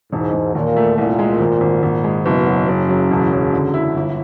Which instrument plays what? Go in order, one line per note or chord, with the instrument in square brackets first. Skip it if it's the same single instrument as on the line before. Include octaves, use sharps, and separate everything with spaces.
[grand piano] E1 [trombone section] G#2
[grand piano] E1
[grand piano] D#2 [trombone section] A#2
[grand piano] A3
[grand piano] C2 [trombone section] A#2
[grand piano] G#3
G#1
G#1
G#1
G#3
[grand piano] F#1 [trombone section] B2
[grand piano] F#3
[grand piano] F#1 [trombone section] C#3
[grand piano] F#3
E1
F#3
D3
E4
G1